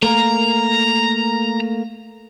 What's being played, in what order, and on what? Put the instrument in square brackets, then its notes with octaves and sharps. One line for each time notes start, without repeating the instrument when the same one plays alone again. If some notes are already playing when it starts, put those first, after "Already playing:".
[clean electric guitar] A3 A#3 A#4 [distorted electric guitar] A#5